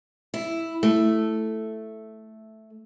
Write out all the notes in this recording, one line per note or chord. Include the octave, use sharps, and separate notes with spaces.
E4
A3